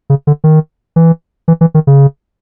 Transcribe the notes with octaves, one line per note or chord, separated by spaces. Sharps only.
C#3
D3
D#3
E3
E3
E3
D#3
C#3